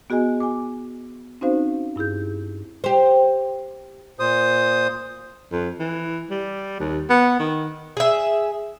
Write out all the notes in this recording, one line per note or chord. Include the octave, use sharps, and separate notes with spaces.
B3 F#4 G#4 D#5 G#5
G#5 D6
C4 C#4 D#4 F#4 C5 F5
G2 E4 G#4 G6
G4 C5
A#2 C5 D#6
F2
E3
G3
D#2
B3
D#3
G#4 E5